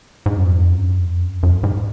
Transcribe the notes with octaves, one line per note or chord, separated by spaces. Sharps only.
G#2
F#2
F2
F#2
F2
F#2
F#2
G#2